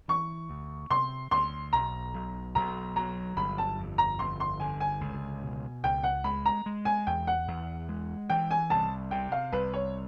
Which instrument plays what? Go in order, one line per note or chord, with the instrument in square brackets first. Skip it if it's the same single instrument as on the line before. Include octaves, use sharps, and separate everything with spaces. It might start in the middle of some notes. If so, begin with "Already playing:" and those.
[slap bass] E3 [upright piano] C#6
[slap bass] D2
[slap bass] C3 [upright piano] C6
[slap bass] D2 [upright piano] C6
[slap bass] B1 [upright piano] A#5
[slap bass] B1
[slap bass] B1 [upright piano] A#5
[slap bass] F#3 [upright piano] A#5
[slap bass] G1 [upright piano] B5
[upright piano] A5
[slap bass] F2
[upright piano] A#5
[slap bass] G1 [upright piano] C6
[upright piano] C6
[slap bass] D3 [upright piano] G#5
[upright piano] G#5
[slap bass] C#2
B2
[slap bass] C#2 [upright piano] G5
[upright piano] F#5
[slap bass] G#3 [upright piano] B5
[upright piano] A#5
[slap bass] G#3
[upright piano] G#5
[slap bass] E2 [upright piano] G5
[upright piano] F#5
[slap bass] E2
G#3
[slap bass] E3 [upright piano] G5
[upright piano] G#5
[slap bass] C2 [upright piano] A5
[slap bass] C3 [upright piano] G5
[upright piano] F5
[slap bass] C2 [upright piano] B4
[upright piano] C#5